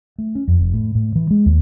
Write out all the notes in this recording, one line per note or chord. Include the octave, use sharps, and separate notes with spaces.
A3
C#4
F2
F1
A2
A2
E3
G#3
D#2